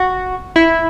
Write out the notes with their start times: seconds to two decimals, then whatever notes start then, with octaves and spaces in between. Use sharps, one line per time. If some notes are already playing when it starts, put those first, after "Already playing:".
Already playing: F#4
0.56 E4